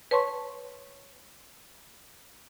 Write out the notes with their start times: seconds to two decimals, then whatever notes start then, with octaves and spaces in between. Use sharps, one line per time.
0.11 B4 C#5 A5 C6 C#6